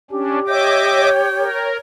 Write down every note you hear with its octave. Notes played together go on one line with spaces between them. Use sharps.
C#4 D4 G4
C#5 D#5 E5 G5 D6
A#4